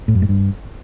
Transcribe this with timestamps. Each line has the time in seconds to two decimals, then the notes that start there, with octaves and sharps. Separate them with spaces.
0.08 A2
0.15 F#2
0.22 G#2
0.29 G2